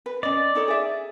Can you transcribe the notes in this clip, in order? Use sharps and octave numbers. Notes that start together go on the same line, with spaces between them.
B4
C#4 D5 D#5
D#4 A4 C#5
G#4 E5